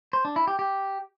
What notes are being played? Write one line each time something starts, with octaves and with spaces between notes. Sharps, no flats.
C5
D4
E4
G4
G4